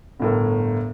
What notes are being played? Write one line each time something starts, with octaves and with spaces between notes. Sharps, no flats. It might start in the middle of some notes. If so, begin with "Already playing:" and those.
G1 A2 A#4